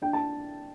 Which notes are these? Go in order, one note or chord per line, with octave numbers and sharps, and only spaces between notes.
D4 G5
A5